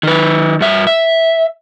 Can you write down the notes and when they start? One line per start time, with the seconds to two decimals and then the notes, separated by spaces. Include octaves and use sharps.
0.03 D#3 B4
0.61 G2 E5
0.87 E5